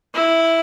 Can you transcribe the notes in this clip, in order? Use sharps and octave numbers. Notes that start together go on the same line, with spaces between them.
E4